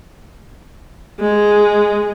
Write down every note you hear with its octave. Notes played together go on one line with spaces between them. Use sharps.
G#3